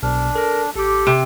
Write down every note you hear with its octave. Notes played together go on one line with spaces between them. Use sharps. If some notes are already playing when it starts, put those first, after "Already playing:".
B1 B2 D4 F6
A4 A#4
A1 G4 A4 D6
C3